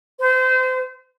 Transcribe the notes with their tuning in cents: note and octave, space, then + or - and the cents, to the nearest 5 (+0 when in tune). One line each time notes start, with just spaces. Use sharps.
C5 -30